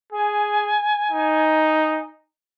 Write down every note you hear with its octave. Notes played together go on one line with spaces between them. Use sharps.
G#4 G#5
D#4